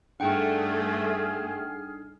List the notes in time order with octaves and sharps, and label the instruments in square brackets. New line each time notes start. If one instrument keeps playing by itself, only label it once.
[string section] G2 A3 [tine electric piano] D4 D#4 [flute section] G#4 F6 [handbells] F#5 G5